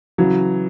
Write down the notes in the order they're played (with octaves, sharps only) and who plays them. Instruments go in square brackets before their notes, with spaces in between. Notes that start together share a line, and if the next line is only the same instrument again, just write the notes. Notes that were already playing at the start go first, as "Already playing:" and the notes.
[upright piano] C#3 E3 [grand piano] F#3